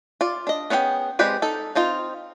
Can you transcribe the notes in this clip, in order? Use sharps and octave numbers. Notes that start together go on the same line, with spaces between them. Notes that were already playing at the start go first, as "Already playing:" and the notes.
F4 D5
D4 D#5
B3 C#4 G#4 C5 G5
G#3 C4 G4 B4 D5
D#4 A4
C4 D#4 F4